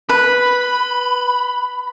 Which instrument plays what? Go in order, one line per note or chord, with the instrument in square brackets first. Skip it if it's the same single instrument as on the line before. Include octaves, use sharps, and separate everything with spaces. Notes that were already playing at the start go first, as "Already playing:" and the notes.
[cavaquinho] B4 [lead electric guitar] B5